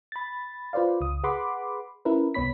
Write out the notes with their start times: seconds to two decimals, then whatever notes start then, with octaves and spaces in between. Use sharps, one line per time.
0.12 B5 A6
0.73 F4 B4 C5 D5 F5
1.01 C#2 D#6
1.24 G#4 B4 F#5 B5 C6 D6
2.05 C#4 E4 A#4 B4
2.34 C2 B3 C#5 B5 B6